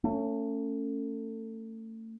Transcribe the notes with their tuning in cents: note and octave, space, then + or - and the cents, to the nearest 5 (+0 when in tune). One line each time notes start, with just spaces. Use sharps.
A3 +30 C#4 +0